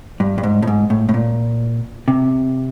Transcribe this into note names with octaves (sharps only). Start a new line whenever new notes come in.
G2
G2
G#2
A2
G#2
A2
A2
A#2
C3